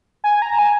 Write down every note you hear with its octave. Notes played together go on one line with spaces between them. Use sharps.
G#5
A#5
G#5